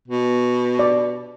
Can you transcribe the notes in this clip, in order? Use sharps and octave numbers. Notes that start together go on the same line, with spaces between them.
B2
D5